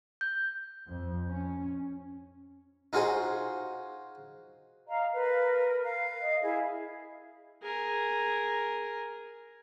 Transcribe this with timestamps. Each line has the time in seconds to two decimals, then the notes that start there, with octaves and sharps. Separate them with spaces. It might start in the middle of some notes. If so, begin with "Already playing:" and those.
0.21 G6
0.87 F2
1.30 C#4
2.93 D#4 F4 F#4 G#4 C5
4.87 D#5 F5 A#5
5.14 A#4 B4
5.84 F5
6.20 D#5
6.43 E4 G#4 E5 F5
7.62 G#4 A#4